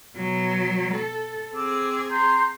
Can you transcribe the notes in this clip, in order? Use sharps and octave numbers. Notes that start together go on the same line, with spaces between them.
B2 F#3
A4
C4 G#4 D6 E6
A#5 C6 G6